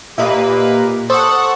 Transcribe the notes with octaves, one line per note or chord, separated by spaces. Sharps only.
A#2 A#3 G4 B4 D#5 E5
A4 C5 F#5 C#6 D#6